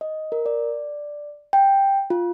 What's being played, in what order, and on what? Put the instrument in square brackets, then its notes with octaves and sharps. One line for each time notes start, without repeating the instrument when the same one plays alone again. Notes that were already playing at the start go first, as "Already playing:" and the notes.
[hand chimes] D#5
A#4
D5
G5
F4